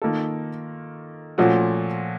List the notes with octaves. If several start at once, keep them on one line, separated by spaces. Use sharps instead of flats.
D#3 A#3 F4 A4
A#2 F3 A3 C#4 F#4